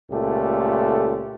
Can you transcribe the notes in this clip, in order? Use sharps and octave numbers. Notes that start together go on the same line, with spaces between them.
C#2 A#2 A3 G4 A4